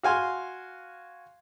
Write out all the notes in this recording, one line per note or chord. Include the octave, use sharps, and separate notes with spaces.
F#4 F5 G#5 C6